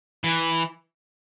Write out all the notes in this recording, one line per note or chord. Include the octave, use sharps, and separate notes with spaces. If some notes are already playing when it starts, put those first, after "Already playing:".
E3